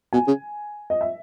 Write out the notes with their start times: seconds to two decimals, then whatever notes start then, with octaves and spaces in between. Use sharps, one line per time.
0.13 B2 G#5
0.27 C#3
0.90 D#5
1.01 E5